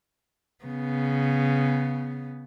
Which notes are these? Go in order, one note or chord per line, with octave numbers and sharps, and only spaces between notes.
C#3 B3